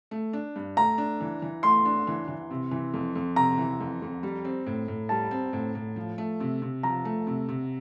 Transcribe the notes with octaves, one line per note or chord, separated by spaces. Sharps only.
A3
D4
G2
A3 A#5
D4
E3
E3
A3 C6
D4
E3
E3
C3
E3
F2
F2
C3 A#5
E3
F2
F2
G3
C4
A2
A2
G3 A5
C4
A2
A2
F3
A3
C3
C3
F3 A#5
A3
C3
C3